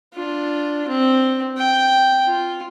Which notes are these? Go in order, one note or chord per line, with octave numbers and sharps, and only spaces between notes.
D4 F4
C4
G5
F4